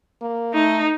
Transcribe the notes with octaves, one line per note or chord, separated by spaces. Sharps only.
A#3
A3 D#4